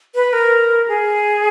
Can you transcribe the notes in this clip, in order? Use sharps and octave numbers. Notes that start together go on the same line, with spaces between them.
B4
A#4
G#4